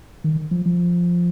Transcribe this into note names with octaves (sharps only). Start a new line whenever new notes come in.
D#3
F3
F3